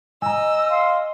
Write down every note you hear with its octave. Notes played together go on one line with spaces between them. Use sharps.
D#5 G#5 A#5 E6
F5 C6